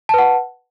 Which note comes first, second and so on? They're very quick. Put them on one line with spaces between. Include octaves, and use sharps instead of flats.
A5 B4 F#5